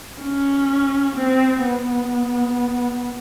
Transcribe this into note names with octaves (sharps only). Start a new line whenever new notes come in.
C#4
C4
B3